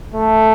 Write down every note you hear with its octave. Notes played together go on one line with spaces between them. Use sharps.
A3